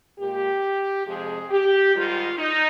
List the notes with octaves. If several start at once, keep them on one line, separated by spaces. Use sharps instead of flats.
A#2 G#3 G4
F2 C3 F3 G#3 G#4
G4
G#2 D#3 G3 F4
D#4